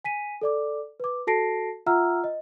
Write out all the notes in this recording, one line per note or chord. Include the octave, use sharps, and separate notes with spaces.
G#5 B6 D#7
A4 D5 D6
B4 D6
F#4 A4 A5 A#6 C7 D7
F4 E5 F#5 A#5 E6 F6
D#5